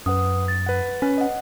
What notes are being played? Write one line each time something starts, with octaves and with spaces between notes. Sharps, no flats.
F#2 B4 F#5 D#6
A6
B4 F#5
C#4 B4
D#5 F#5